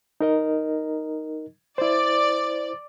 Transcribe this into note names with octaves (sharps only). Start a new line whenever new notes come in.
D#4 A#4 D#5
E4 C5 D5